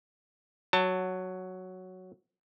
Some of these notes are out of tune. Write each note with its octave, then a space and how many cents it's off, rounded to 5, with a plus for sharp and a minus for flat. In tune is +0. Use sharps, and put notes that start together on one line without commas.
F#3 +0 A5 +35